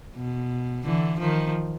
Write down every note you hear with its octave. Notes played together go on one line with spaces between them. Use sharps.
B2
D3 E3
D#3 F3